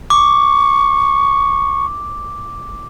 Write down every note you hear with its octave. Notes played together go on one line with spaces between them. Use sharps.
C#6 D6